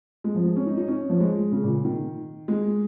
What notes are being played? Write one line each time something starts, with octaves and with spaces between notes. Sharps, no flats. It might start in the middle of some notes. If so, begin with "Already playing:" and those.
G#3
F3
G#3
C#4
D#4
D#4
C#4
F3
G#3
C#3
A#2
D#3
G#3